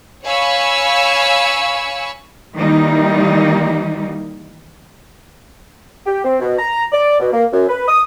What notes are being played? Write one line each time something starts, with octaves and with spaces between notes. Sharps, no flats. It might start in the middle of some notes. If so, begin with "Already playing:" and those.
C#5 F5 G#5 B5 C#6 E6
D#3 E3 G3 A#3 D#4
G4
C4
B2
A#5
D5
B2
A#3
F#2
B4
D#6